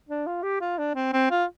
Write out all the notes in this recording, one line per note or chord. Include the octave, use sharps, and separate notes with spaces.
D4
F4
G4
F4
D4
C4
C4
F4